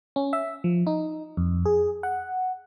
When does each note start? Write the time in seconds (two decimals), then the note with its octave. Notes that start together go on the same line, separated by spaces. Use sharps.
0.16 C#4
0.33 E5
0.64 F3
0.87 D#4
1.37 F2
1.66 G#4
2.03 F#5